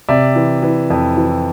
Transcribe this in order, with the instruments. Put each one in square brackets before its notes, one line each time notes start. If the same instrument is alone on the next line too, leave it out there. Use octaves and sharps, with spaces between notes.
[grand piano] C3 D5 E5
E3
E3
F2
E3